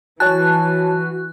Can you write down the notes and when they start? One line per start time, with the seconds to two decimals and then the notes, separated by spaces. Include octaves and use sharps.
0.20 E3 F#4 C#5 G#5 A5 F#6